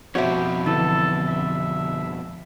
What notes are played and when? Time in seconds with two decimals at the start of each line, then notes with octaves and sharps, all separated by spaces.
0.15 F2 B2 F#4 G4 C5 C#5 E5
0.66 D3 E3 E4 A4
1.27 E5